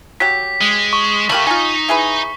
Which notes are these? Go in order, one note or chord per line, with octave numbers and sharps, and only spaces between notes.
F#3 G4 B6
G#3
C#6
D3 A3 A#3 G4 B5
D#4 F4 G#5
E4 G#4 B4